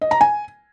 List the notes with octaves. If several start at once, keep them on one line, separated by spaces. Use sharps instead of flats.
D#5
A#5
G#5